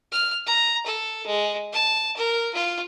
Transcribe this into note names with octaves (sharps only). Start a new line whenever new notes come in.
F6
A#5
A4
G#3
A5
A#4
F4